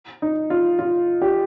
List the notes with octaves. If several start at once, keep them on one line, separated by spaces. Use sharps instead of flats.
D#4
F4
F4
G4